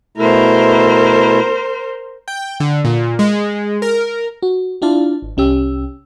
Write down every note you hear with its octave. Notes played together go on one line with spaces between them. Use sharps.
B2 A3 E4 A#4 C5
G5
D3
A#2
G#3
A#4
F#4
D4 E4 F4 D5 F5 A5
G#1
C2 C#4 G4 E6